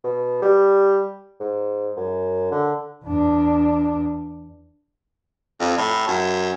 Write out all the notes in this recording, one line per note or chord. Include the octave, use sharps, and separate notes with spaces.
B2
G3
G#2
F#2
D3
E2 D4
F2
A2
F#2